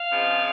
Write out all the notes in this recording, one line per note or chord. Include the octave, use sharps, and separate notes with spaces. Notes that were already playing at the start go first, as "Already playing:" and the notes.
Already playing: F5
C#3 F3 G#3 C4